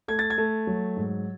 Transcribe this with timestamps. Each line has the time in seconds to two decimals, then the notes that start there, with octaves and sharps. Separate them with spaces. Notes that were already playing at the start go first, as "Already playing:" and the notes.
0.08 A3 G#6
0.19 A6
0.30 G#6
0.38 A3
0.67 F#3
0.97 G#2